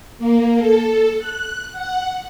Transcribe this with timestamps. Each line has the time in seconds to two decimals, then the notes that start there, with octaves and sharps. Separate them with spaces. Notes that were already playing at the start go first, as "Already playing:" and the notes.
0.18 A#3
0.59 A4
1.19 F#6
1.72 F#5